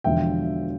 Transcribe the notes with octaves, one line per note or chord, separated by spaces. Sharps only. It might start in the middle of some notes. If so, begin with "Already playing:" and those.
E1 E2 D3 F3 E5 G5